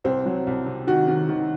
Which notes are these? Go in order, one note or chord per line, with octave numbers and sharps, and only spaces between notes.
C2 C4
F#3
C2
C3
D#3 F#4
D#3
D#3